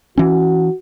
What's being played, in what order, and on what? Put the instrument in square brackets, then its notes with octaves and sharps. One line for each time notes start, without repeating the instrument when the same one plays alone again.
[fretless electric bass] E3 C#4 [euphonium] F#4